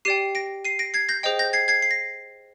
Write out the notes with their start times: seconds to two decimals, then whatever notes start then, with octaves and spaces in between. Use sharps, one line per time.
0.05 G4 D5 G5 C7 D#7
0.35 A#6 D7
0.65 C7 D#7
0.79 A#6 D7
0.94 G#6 C7
1.09 G6 A#6
1.23 G#4 C5 D#5 G5
1.39 G6 A#6
1.53 G#6 C7
1.68 G#6 C7
1.82 C7
1.91 A#6